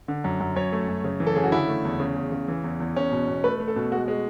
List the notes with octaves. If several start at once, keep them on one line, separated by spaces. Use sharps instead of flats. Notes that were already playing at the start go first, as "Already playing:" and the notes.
D3
F#2
F#2
F#2 C#5
A3
F#2
C#3
E3
A4
C#3 G#4
F#4
D3 E4
A3
E2
C#3
E2
C#3
E3
E2
E2
E2 C#4
B2
B2
A3 B4
A3
A4
B2
G#3 F#4
G#3